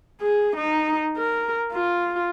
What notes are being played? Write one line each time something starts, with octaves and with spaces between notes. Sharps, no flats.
G#4
D#4
A#4
F4